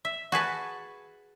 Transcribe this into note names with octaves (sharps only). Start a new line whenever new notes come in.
E5
F#4 G#4 B4 A5